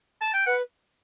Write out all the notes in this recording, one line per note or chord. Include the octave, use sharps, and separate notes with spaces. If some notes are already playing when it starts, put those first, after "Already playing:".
A5
G5
B4 F#5